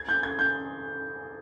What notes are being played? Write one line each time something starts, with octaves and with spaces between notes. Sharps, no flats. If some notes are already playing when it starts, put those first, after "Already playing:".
Already playing: G#6
G6
G#6
G6